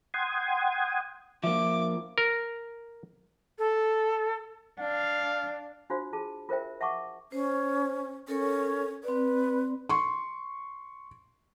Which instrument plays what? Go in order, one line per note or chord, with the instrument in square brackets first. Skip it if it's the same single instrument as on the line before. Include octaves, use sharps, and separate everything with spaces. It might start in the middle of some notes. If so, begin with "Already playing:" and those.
[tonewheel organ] F#5 G5 C6 D#6 G#6
[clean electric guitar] F3 A#3 [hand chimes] E5 [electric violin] D6
[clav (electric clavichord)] A#4
[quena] A4
[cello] D4 [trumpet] F5
[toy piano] D4 F4 F#4 C5 F5
F4 G#4 A5
F4 A#4 C5 E5 G5
E5 F#5 A5 C#6 D6
[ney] C#4 [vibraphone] C5
[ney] C#4 [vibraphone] A4 A#4 C#5
[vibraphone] C4 D5 [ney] B4
[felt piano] C6 C#6